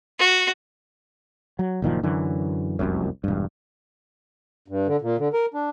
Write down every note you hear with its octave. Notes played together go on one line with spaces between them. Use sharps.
F#4
F#3
F#1 A#2 D#3 F3
F#2 D3 E3
F1 C2 F#2
E1 G2
G2
D3
A#2
D3
A#4
D4